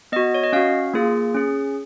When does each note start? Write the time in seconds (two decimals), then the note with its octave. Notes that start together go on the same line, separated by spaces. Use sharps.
0.12 B3 F#4 D#5
0.34 C#5
0.44 D#5
0.53 C#4 F#4 F5
0.94 A#3 F4 G#4
1.34 C#4 G#4